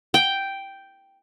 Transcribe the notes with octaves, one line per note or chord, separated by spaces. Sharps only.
G5